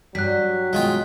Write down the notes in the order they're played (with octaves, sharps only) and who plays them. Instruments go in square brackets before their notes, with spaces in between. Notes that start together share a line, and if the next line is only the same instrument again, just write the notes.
[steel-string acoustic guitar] G2 G3 [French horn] F#3 [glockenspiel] F#6 B6
[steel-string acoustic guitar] B2 D#3 [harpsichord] G#3 F4 G5